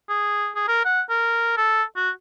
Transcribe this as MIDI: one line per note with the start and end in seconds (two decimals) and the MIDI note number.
0.09 0.50 68
0.56 0.64 68
0.68 0.80 70
0.85 1.01 78
1.10 1.55 70
1.57 1.83 69
1.97 2.10 66